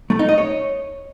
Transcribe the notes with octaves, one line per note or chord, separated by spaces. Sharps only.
A3
D#4
D#5
C#5